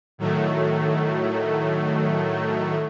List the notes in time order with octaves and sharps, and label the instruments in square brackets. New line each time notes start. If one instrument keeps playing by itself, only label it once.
[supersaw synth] A2 D#3 F#3 A3